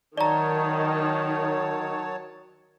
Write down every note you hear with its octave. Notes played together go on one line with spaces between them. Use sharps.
D#3 F#3 C#5 D5 A5 A#5